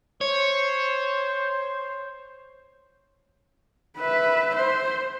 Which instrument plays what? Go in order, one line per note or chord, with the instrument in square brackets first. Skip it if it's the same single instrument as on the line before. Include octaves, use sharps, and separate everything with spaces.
[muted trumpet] C5 [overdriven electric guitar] C#5
[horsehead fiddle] B4 E5
C5